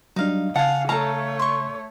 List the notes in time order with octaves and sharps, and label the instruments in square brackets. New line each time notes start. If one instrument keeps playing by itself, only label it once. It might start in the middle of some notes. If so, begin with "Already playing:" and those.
[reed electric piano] F#3 G3 D4 [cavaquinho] D#4 F5
[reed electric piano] C#3 [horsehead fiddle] F5 [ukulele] F#5 [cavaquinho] G#5 A5
[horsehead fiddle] A3 C#5 [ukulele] A4 A#5 [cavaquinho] F5 A5
[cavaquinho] C6 C#6